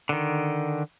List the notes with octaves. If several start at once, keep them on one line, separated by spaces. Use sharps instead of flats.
D3 D#3